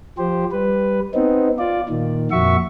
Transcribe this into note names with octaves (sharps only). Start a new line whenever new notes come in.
F3 G4 C5
G3 B4
B3 C4 D#4
F4 D5
A#2 D#3
F2 A#2 F#4 E5 C#6